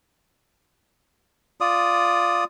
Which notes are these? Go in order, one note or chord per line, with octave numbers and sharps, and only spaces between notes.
F4 D5 D#6